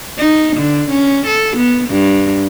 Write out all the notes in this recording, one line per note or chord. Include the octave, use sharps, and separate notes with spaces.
D#4
D3
C#4
A4
B3
G2